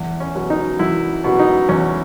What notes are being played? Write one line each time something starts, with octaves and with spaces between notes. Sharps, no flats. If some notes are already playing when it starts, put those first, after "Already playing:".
Already playing: E2
C#4
B2 F#3
D#4
E2 E4
B2 F#3
D#4
E2 C#4